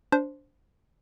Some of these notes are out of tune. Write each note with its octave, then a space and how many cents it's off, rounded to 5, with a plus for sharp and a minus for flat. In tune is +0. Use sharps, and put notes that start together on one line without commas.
D4 -20 C5 +0